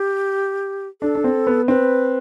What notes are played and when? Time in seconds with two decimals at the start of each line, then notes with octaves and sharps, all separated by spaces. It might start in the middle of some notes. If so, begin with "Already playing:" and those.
Already playing: G4
1.01 D4 A4
1.15 D4
1.24 C4
1.47 B3
1.68 C4 B4